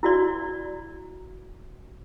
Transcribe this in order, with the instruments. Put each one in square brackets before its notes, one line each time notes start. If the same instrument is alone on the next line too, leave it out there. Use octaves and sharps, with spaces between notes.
[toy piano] E4 F#4 D5